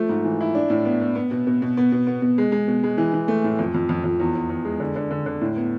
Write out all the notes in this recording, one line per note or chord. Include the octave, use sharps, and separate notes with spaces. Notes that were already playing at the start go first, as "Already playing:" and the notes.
Already playing: F3 A3
G#2
E3
E4
D4
A2
B3
B3
B3
B2
B2
B2
B3
B2
B3
B2
G#3
G#3
B2
G#3
E3
E3
A3
A2
F2
F2
F2
F2
E2
E2
E2
G#3
D3
D3
D3
D3
A2
B3